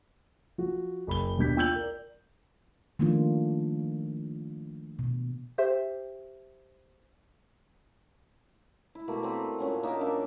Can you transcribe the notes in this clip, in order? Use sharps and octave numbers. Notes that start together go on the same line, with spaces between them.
F3 F#4
F#1 B5 G7
D#2 B2 G3 D4 G6 B6
F4 G5 E6 G6 F#7
A#4 D5
D#3 F3 A3 A#3 D4 F4
B2
G4 C5 E5
E4
B2 A3 A#3
G3 C4 B4
A#2 C#4 F#5
A#3 D4 D#4 E5
C#4 D4 E5